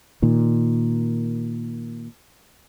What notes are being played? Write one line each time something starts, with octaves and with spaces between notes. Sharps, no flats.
A#2 D#3